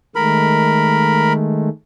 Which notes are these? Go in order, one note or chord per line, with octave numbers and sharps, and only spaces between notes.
D#3 G#3 A3 A#4 B5